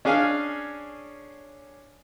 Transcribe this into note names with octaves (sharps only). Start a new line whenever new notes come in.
C#4 D4 G#4 F5 G#5